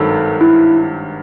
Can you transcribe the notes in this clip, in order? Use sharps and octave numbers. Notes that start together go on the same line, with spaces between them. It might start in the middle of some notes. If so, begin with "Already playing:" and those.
Already playing: G#1 G2 D#3 F#3 A4
E4